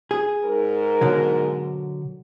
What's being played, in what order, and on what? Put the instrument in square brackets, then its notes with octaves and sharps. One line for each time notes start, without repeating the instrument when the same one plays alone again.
[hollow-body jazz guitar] G#4
[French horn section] G#2 A#4
[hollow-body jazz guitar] B2 D3 F#3